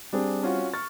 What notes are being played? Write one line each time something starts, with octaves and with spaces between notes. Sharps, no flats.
G3 C4 D4 G#4
C#4 F4 F#4
C#6 F6 A6